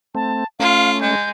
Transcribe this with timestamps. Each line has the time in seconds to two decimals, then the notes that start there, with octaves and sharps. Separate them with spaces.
0.15 A3 C4 A5
0.60 A3 C#4 F4 F5
1.01 G#3 G6